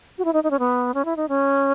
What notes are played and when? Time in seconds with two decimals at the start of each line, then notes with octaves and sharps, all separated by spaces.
0.18 F#4
0.25 E4
0.33 D#4
0.44 D#4
0.51 C#4
0.59 B3
0.94 C#4
1.05 E4
1.16 D#4
1.29 C#4